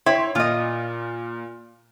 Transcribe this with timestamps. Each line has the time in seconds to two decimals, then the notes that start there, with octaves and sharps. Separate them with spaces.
0.06 E4 C#5 G5 C6
0.35 A#2 F4 D#5